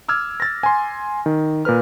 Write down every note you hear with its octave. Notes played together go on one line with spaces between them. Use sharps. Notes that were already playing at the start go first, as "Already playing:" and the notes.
D6 E6 F6 G#6
A6 A#6
G#5 C6
D#3
A#2 A#4 B4 F6